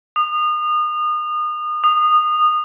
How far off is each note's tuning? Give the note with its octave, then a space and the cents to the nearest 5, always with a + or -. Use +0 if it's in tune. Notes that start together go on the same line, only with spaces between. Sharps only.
D#6 -30
D#6 -20